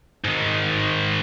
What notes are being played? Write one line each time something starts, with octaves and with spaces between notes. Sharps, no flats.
G#2 D#3